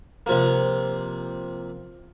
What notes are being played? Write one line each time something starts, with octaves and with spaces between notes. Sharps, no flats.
C3 F3 A#3